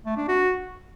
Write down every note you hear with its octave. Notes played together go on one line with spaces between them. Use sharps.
A3
D4
F#4